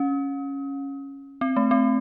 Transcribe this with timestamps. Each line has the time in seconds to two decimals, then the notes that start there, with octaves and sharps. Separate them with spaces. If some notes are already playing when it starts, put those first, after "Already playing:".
Already playing: C#4
1.41 C4
1.56 A3
1.71 C4